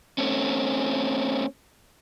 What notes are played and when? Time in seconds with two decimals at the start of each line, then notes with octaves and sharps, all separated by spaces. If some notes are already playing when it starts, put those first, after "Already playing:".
0.18 A3 C4 C#4